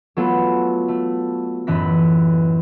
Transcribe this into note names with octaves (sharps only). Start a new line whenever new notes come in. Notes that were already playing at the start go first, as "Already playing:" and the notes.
F#3 A3 B3 F4 A4
A3
A1 F#2 E3 F#6 B6